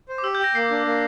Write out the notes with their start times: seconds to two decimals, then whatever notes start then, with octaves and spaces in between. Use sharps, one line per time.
0.09 C5
0.18 D6
0.24 G4 E6
0.35 G6
0.40 G5 A#6
0.55 A#3 C7
0.70 D4
0.86 A#3